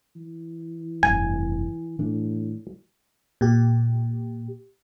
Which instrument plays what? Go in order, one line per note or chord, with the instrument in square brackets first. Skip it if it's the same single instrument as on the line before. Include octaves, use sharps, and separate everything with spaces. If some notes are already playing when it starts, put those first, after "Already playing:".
[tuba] E3
[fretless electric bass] F1 G2 [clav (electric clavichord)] G#5
[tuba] A2 [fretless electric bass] E3 D4
[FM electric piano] A#2 G4